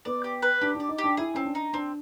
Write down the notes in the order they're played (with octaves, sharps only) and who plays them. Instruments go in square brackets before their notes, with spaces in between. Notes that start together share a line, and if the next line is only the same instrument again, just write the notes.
[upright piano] B3 [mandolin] D5
[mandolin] G4
B4
[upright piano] D4 [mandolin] G4
[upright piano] D4
[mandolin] D5
[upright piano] D#4
[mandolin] G4
[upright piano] D4
[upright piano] E4 [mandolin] G#4
[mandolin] C4 [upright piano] C#4
[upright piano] D4
[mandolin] D#4
[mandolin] C4 [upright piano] D4